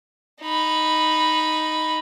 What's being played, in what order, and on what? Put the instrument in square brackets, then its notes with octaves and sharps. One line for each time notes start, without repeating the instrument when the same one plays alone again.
[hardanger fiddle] D#4 B5